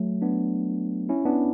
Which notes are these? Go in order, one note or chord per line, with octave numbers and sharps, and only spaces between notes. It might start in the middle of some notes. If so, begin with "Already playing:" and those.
Already playing: F#3 A3
B3 D4
C#4 E4
B3 D4